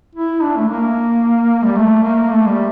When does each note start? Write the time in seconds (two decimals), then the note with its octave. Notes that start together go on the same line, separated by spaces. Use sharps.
0.15 E4
0.42 D4
0.57 A3
0.69 A#3
1.64 G3
1.76 A3
2.03 A#3
2.30 A3
2.48 G3